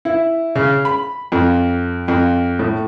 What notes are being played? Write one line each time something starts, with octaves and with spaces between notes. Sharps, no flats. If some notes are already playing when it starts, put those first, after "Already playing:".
E4
C#3
B5
F2
F2
A2